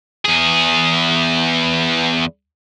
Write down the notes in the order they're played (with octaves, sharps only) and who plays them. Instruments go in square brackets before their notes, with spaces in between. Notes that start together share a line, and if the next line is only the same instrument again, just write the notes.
[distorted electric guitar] E2 G#4